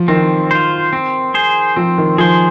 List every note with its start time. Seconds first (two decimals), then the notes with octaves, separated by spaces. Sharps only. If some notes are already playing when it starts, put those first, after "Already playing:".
Already playing: F3
0.08 D#3 C4
0.51 F4 C5
0.93 C4
1.34 G#4 C5
1.76 F3 C4
1.98 D#3
2.18 F3 G#4 C5